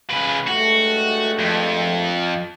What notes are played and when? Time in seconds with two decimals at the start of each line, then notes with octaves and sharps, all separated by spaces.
0.11 C#3 B4
0.48 G2 G#3 A3 F#4
1.39 F2